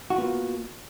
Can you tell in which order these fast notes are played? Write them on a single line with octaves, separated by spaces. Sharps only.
F#4 F4 B3 A#3